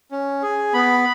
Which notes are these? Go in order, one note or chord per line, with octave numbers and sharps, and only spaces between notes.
C#4
G#4
B3 B5